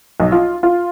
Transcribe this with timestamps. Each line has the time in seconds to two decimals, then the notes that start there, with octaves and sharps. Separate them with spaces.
0.20 B1
0.32 F4
0.63 F4